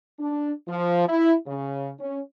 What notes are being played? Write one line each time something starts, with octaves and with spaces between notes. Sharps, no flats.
D4
F3
E4
C#3
C#4